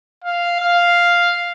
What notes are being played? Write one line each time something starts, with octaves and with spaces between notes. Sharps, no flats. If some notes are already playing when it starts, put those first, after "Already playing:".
F5
F5